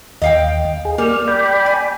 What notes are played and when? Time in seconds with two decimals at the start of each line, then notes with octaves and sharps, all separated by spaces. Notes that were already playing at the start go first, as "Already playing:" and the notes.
0.22 D#2 D#5 F5 G5
0.85 G#4
0.98 G3 A#3 F6
1.28 D5 G5 B5
1.66 G#5